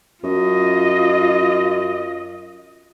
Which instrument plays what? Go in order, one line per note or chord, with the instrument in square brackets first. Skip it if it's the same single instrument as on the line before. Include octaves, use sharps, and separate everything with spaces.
[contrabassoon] F#2 [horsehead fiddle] F4 D#5